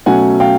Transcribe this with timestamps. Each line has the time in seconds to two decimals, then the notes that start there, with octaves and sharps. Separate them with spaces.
0.06 B2 F#3 A3 C#4 F#5 G#5
0.40 F5 G5